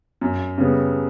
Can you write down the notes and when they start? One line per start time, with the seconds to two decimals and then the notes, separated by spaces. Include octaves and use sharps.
0.21 F#2
0.58 C#3 G3 B3